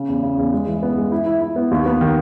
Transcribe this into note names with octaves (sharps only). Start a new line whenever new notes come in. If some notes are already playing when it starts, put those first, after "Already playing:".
Already playing: C#3
E2
C#3
E2
G#3
E3
B3
G#3
E4
E4
E4
B3
D#2
B3
D#3